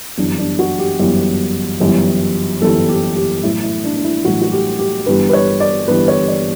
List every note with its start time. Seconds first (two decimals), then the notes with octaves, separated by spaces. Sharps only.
0.18 G1 F#2 E3 G3 D4
0.39 D4
0.59 F#4
0.79 G4
0.99 G1 F#2 E3 G3
1.80 G1 F#2 E3 G3
2.62 G1 F#2 E3 G3 A4
2.89 G4
3.16 G4
3.43 A1 A2 F#3 E4
3.63 E4
3.84 D4
3.96 D4
4.04 E4
4.25 A1 A2 F#3 F#4
4.42 F#4
4.52 G4
4.79 G4
5.06 G1 G2 E3 G3 B4
5.29 B4
5.33 C#5
5.60 D5
5.88 G1 G2 E3 G3 B4
6.08 C#5
6.28 D5